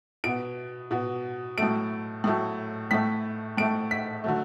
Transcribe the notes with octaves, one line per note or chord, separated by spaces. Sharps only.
B2 B3 D7
B2 B3
A2 F#3 A3 D7
A2 F#3 A3
A2 A3 B6
A2 A3 D7
B6
D3 F#3 A3